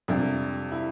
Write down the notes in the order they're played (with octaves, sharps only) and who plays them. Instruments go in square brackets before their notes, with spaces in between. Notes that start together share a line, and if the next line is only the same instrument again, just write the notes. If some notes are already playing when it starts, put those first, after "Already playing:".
[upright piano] F2 C3 G3 D4
E4